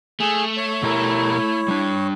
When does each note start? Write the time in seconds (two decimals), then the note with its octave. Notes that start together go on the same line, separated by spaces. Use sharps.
0.20 A3 G#4
0.57 C#5
0.83 B2 E4 G4 A#4
1.68 G3 D4